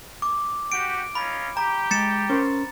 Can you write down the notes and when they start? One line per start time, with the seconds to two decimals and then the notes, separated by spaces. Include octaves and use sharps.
0.22 D6
0.72 F#4 G4 D7
1.15 C#4 D#4 F4 B5
1.57 G4 G5 A#5
1.91 G#3 A6 C#7 E7
2.29 C#4 A#4 C5